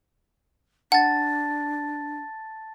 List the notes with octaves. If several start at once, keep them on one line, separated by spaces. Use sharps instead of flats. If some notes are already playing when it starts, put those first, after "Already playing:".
D4 F#5 A5 A6